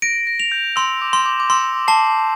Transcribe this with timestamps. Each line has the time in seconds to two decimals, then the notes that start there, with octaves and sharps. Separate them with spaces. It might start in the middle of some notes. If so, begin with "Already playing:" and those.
0.02 A#6 D7
0.27 A#6
0.40 F7
0.52 G6
0.76 C6 E6
1.01 D6
1.13 C6
1.26 D6
1.40 D6
1.50 C6 E6
1.88 A5 C7